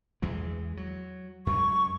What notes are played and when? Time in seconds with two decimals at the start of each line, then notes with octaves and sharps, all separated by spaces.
0.22 E2 E3 G#3
0.77 F#3
1.47 F#2 G#3 C#6